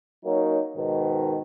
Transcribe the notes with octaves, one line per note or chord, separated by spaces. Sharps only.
F#3 A#3 C#4 D#4
G#2 B2 D#3